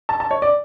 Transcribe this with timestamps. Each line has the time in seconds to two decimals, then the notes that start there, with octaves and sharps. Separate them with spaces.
0.09 A5
0.20 A5
0.31 C#5
0.42 D5